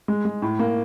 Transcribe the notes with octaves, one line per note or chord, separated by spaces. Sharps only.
G#3
G#3
A2
A#3